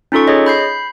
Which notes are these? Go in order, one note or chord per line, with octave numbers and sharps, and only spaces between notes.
C#4 D#4 F4 A4 C#6
G#4 C#5 D#5
B5 G6 C7